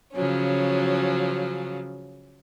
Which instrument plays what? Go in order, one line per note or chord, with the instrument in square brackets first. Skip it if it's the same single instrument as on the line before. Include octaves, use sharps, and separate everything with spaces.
[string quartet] C#3 F3 F#3 C#4